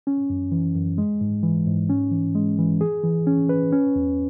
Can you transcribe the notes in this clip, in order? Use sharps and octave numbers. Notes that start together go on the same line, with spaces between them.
C#4
F#2
E3
F#2
G#3
G#2
E3
G#2
C#4
E3
G#3
E3
G#4
E3
C#4
B4
C#4
E2